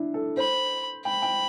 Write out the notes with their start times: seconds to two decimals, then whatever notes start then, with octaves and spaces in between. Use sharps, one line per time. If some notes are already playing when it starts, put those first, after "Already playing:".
Already playing: D4 E4
0.14 A4
0.37 C5 B5
1.05 G5 B5
1.22 G5